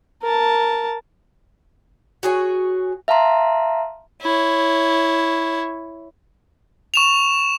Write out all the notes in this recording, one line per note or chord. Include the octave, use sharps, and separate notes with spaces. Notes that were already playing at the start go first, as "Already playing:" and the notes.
A#4 A5
F#4 G#4 C#5
E5 F5 A5 A#5 C6
E4 C#5
C#6 E7 F7